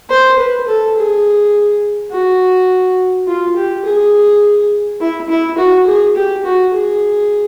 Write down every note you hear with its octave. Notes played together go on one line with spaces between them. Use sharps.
C5
B4
A4
G#4
F#4
F4
G4
G#4
E4
E4
F#4
G#4
G4
F#4
G#4